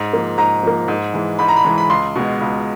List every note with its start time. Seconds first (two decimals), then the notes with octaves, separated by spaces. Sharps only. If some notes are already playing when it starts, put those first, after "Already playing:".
Already playing: G#2
0.13 F3 A#3
0.38 G#2 A#5
0.63 F3 A#3
0.88 G#2
1.14 E3 G#3
1.39 G#2 B5
1.48 A#5
1.56 B5
1.64 E3 G#3
1.78 B5
1.90 C#2 C6
2.16 B2 G#3
2.41 C#2